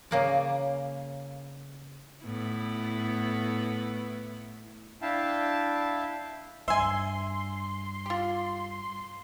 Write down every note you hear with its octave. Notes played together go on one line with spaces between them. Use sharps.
C#3 A#3 D5
A2 B3 E4
D4 E4 E5 F5 G5 A5
G2 E5 G#5 C6
F4 G4